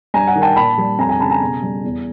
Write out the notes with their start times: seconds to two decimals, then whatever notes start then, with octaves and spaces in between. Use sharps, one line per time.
0.14 G2 G#5 A#5
0.27 F#5 G#5
0.35 D#3
0.42 G5 A5
0.56 A#2 A5 B5
0.78 G3
0.99 F2 G#5 A#5
1.09 G#5 A#5
1.20 C#3 A5 B5
1.31 G#5 A#5
1.41 B2
1.62 G3
1.84 E2